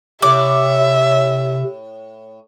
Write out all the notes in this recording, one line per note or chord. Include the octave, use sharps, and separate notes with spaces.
A2 C3 C#5 E5 D6